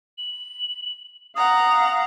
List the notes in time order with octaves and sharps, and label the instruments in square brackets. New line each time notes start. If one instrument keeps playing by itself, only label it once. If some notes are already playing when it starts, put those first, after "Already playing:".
[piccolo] F#7
[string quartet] F5 F#5 A#5 [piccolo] D#6